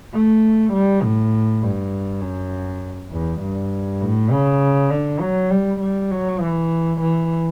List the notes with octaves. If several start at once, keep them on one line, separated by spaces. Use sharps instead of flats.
A3
G3
A2
G2
F#2
E2
G2
A2
C#3
D3
F#3
G3
G3
F#3
E3
E3